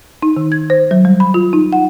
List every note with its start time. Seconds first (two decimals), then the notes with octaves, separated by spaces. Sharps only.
0.23 D#4
0.37 D#3
0.52 G#6
0.70 C5
0.91 F#3
1.05 G3
1.20 B5
1.34 F4
1.53 D#4
1.73 F#5